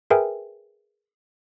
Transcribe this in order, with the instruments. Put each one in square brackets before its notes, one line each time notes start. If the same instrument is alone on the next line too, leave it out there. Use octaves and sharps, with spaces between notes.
[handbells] G#4 A#4 B4 E5 G5 G#5